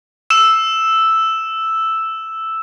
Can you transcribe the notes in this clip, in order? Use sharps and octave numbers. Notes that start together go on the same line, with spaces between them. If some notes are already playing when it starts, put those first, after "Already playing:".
E6 E7